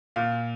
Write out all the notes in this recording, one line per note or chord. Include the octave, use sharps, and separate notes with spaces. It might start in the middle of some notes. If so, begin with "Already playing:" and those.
A#2 F5